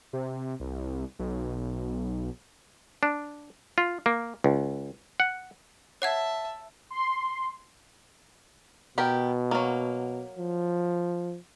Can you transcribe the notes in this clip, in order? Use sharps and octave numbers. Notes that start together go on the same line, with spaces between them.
C3
C2
B1
D4
F4
A#3
C#2
F#5
C#5 E5 F#5 A5 G#6
C6
B2 B3 G4 A#4
F#3 A#3
F3